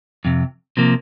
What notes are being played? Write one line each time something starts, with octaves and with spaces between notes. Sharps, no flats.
F2 C3
C3 F3 A#3